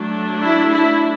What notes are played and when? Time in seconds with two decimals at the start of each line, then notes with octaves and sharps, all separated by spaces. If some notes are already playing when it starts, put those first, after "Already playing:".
Already playing: F#3 A3 D4
0.42 E4
0.73 E4